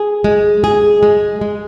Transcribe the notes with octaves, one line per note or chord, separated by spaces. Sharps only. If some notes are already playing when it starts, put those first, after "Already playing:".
Already playing: G#4
G#3
G#4
G#3
G#3